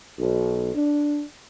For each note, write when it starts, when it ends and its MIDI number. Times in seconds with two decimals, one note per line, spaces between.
0.19 0.74 35
0.75 1.22 62